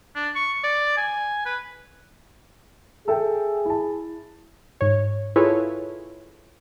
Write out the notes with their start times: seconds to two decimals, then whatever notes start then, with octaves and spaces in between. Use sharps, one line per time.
0.15 D4
0.36 C#6
0.63 D5
0.97 G#5
1.46 B4
3.08 G#4 A4 E5 G5
3.65 E4 A5
4.81 G#2 C#5
5.36 E4 F4 G#4 A4 B4 C#5